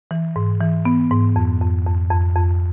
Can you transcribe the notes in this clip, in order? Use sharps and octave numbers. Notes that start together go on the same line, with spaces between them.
E3
G#2
E3
B3
G#2
F2
F2
F2
F2
F2